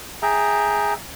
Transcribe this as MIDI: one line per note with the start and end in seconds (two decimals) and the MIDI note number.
0.22 0.94 68
0.22 0.94 76
0.22 0.94 79
0.22 0.94 82